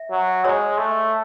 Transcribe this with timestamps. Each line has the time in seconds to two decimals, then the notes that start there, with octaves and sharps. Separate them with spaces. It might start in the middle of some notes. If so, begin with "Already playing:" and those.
Already playing: E5
0.11 F#3
0.45 G#3 C#5
0.78 A3